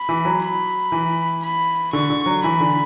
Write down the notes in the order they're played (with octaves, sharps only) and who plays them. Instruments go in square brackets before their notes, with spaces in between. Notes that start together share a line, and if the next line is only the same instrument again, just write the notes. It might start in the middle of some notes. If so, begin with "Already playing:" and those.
Already playing: [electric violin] B5
[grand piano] E3
F#3
[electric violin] B5
[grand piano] E3
[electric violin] B5
[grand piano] D3 [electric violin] C#6
[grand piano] D3
F#3
[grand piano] E3 [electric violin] B5
[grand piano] D3